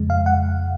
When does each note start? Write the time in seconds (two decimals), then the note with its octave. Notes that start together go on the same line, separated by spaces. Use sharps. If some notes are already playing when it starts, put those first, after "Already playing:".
Already playing: F2 C#3 G#3
0.10 F5
0.26 F#5